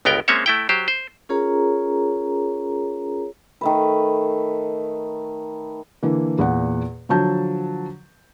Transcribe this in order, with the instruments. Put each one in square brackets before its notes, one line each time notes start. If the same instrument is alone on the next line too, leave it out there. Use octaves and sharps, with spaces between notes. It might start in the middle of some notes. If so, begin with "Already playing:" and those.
[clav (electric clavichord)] G1 C#2 B3 A#4 G5
G#3 A#3 C4 C#4 C#5 E5
A3 E4 G5
F#3 G4 C5
C5
[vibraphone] C#4 F4 G#4 A#4 C#5 A#5
[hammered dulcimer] D#3 A3 B4
[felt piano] D3 E3 A#3
E2 A#2 F#5
D3 F3 F#3 A5 G6